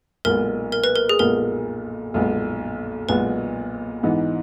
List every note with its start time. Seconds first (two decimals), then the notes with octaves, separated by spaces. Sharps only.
0.25 B1 A#2 G#3 B3 A#4
0.72 A#4
0.84 B4
0.96 A#4
1.09 G#4
1.19 B1 A#2 G#3 B3 A#4
2.14 B1 A#2 G#3 B3
3.09 B1 A#2 G#3 B3 B4
4.03 G#2 E3 B3 D#4